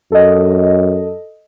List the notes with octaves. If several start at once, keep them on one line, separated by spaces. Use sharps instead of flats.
F#2 A4 D#5